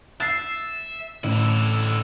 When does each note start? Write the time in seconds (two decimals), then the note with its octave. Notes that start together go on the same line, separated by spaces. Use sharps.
0.20 E5 A6 C7
1.24 A1 D3 E4